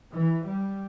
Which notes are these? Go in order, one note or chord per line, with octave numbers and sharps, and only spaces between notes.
E3
G3